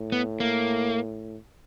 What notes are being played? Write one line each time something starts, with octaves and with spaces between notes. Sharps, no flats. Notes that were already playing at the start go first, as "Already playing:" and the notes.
Already playing: A2
B3
A#3